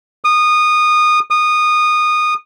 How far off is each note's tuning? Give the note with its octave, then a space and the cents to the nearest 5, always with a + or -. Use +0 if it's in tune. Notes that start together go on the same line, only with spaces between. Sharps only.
D#6 -20
D#6 -20